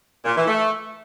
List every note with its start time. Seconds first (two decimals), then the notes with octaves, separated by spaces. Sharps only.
0.25 A#2
0.36 E3
0.47 A3